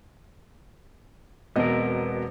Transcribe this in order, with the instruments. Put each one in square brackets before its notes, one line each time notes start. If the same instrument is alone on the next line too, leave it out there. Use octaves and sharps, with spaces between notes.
[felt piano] E1 B2 D#5 [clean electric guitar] B3 C4 A#4